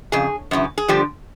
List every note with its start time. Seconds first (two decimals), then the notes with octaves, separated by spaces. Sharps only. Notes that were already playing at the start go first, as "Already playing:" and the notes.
0.12 F2 C#3 G#4
0.51 F#2 C#3 E3
0.78 G#4
0.88 D3 F3 G3 G4